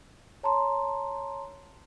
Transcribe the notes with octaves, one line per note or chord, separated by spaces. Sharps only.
C#5 A5 A#5 C6